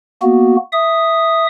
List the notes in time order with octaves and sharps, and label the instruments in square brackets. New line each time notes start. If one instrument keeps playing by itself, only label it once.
[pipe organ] A#3 B3 F#4
E5 D#6